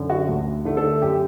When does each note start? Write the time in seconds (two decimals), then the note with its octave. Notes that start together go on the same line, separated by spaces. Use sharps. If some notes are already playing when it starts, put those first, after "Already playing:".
Already playing: F#2 D3
0.10 F#4
0.28 D2
0.65 D3 A3
0.77 A4
1.02 F#2 G4